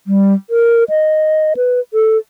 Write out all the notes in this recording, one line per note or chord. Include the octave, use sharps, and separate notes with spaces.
G3
A#4
D#5
B4
A4